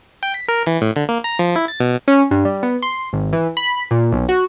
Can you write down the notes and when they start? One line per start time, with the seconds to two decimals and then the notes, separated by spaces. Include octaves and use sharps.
0.23 G5
0.34 B6
0.48 A#4
0.67 E3
0.81 A2
0.96 D3
1.09 A#3
1.24 A#5
1.39 F3
1.56 E4
1.68 A6
1.80 B2
2.08 C#4
2.31 G2
2.45 G3
2.63 B3
2.82 C6
3.13 G#1
3.33 E3
3.57 B5
3.91 A#2
4.12 B1
4.29 F#4